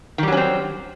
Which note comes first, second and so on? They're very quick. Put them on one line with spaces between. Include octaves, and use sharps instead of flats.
D#3 G3 F#3 C#4 C4